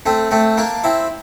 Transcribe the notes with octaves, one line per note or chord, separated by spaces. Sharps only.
A3 C4
A3 C4
A#3 D4
C4 E4